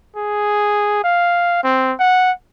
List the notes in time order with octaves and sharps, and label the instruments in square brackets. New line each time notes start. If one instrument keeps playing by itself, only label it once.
[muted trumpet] G#4
F5
C4
F#5